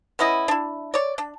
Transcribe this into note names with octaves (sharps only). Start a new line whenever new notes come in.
B3 C#4 E4 D#5
D4 E4
C#5 D5
D4